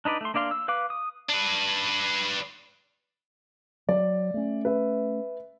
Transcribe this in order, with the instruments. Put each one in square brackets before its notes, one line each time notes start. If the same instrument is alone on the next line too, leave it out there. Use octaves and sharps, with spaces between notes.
[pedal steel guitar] D4 D#4 B4 D5
A3 C6
A#3 D4 D5 F5 C6
E6
B4 F5 D6
D#6
[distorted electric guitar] D4 B4
[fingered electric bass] F#3 [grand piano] D5
[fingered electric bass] A3 C#4
[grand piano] B4 E5